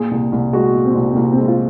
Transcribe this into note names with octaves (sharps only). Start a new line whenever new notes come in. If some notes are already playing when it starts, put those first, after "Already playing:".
Already playing: A#2 G#4
C2
C2
G#3 F#4
A#2
C4
C2
C4
C2 A#3
C4
G#3
F4